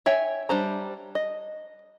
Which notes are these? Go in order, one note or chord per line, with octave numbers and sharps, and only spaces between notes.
C#5 E5 G5 G#5
G3 D4 C5 A#5
D#5